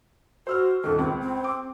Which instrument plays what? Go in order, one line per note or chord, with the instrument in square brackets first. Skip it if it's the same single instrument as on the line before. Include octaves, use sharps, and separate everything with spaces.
[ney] F#4 [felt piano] C5 E6 F6
[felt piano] D#1 D#3 [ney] A4
[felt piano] C#2 [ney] C4
[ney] C4
[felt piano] D6